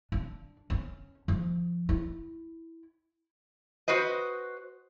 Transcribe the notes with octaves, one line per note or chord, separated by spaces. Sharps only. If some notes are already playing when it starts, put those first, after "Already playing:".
D4
C#4
F3
E4
F#4 B4 C5 D#5